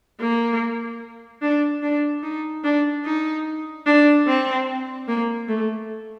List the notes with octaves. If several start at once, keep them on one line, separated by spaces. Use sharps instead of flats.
A#3
D4
D4
D#4
D4
D#4
D4
C4
A#3
A3